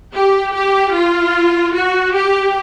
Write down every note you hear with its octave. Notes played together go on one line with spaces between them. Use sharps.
G4
G4
F4
F#4
G4